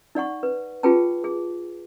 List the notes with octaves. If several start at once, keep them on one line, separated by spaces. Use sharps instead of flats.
D#4 D5 F#5 C#6
B4
F4 G4 G#4 B4 G5 A5
G#4